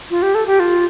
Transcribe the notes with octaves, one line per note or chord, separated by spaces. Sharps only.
F4
G4
A4
G4
F4